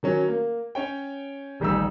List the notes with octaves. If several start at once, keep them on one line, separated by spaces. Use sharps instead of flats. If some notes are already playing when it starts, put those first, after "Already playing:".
D#3 F#3 C#4
A#3
C#4 C#5 G5
D#1 A1 G3 D#4 E6